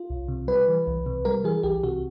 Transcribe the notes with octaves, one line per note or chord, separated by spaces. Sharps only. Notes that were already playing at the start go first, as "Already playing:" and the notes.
Already playing: F4
C2
C3
G3 B4
E3
C2
C3
G3 A#4
E3 G#4
C2 G4
C3 F#4